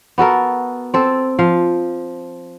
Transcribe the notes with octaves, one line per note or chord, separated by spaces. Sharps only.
B3 F#4 A4 A#4
C4 A4
F3 F5